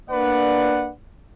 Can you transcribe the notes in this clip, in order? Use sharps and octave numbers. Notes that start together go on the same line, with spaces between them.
A#3 D4 B4 D5 F#5